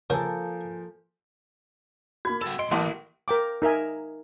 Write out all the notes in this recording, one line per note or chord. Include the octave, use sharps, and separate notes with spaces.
C#3 F3 A#3 A4 A#4 G#5 G6
A#3 F#4 B5 G#6
B3 A4 G5 E6
B1 D#5 C6 D7
A1 E3 A#3 E5 A5 C6
A#4 G5 D6
D#4 A#4 E5 G#5